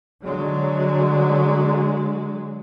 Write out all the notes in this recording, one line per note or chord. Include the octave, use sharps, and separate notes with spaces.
D3 F#3 G#3